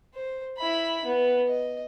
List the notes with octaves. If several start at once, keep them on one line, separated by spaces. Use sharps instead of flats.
C5
E4 B5
B3
D#5